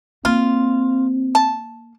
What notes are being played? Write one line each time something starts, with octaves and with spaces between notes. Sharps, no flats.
A#3 C4 F4
A5